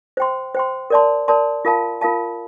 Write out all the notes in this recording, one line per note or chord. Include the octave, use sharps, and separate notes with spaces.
C5 G5 C6
C5 G5 C6
A#4 D5 A5 C6
A#4 D5 A5 C6
F4 A#4 F5 A5
F4 A#4 F5 A5